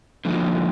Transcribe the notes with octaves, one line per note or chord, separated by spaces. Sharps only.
D3 F3 A#3 D#4